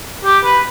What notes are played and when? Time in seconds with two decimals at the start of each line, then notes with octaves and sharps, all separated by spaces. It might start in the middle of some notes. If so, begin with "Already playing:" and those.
0.25 G4
0.44 B4